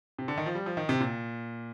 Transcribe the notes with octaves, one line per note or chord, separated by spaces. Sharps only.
C3
D3
D#3
F3
G3
F3
D#3
C3
A#2